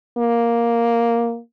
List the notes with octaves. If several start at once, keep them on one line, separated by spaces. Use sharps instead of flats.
A#3